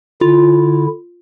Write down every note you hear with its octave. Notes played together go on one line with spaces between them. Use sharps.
D3 E4 F4